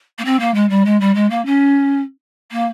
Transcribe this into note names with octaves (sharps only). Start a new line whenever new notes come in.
A#3
C4
A#3
G#3
G3
G#3
G3
G#3
A#3
C#4
A#3